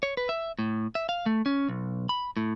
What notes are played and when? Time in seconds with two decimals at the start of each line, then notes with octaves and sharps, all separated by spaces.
0.03 C#5
0.17 B4
0.29 E5
0.59 A2
0.95 E5
1.09 F5
1.26 A3
1.46 C#4
1.68 B1
2.09 B5
2.37 A2